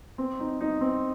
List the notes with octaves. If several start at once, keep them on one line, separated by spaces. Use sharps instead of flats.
C4
D#4
D#4
C4